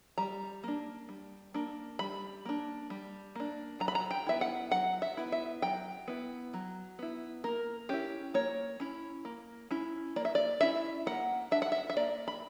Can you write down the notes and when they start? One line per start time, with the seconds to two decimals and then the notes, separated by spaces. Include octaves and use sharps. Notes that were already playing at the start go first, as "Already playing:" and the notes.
0.18 G3 A#5
0.64 A#3 D4
1.09 G3
1.54 A#3 D4
1.99 G3 B5
2.45 A#3 D4
2.90 G3
3.36 A#3 D4
3.80 F#3 A#5
3.88 B5
3.95 A#5
4.11 G5
4.27 B3 E4 E5
4.41 F#5
4.71 F#3 F#5
5.02 E5
5.17 B3 E4
5.32 E5
5.62 F#3 G5
6.08 B3 E4
6.54 F#3
6.99 B3 E4
7.44 A#3 A#4
7.89 C#4 E4 G4
8.34 A#3 C#5
8.80 C#4 E4
9.25 A#3
9.71 C#4 E4
10.16 A#3 D5
10.25 E5
10.35 D5
10.61 C#4 E4 E5
11.06 A#3 F#5
11.51 D4 E5
11.62 F#5
11.72 E5
11.90 E5
11.97 A#3 D5
12.28 B5